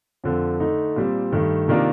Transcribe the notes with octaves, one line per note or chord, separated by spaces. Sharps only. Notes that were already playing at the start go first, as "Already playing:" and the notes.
F2 D3 F3 C4
D3 A3 D#4
A#2 G3 C4
G2 D#3 A3
C3 D#3 A#3 D4 F4